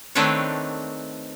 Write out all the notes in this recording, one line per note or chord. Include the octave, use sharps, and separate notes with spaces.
D#3 A3 C4 D4 B4 C#5